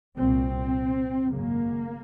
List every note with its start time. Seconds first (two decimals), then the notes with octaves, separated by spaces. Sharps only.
0.18 C2 A#2 C4
1.28 G#1 F#2 C#3 A#3